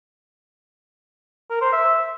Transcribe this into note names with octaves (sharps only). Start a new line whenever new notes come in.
A#4
C5
E5